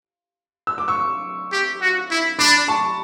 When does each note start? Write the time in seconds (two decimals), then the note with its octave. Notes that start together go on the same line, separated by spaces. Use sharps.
0.67 E6
0.78 D6
0.88 C#6 E6
1.53 G4
1.81 F#4
2.11 E4
2.39 D4 B5 D6
2.68 A5 C#6